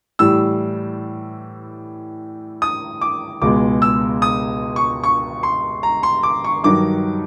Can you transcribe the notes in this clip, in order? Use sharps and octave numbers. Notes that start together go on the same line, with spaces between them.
A2 E3 G3 E6
D#6
D6
C#2 B2 G#3 D6
E6
D#6
C#6
C#6
C6
A#5
C6
D6
C#6
G2 D#3 F#3 D6